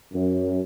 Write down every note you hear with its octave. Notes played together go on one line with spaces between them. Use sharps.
F#2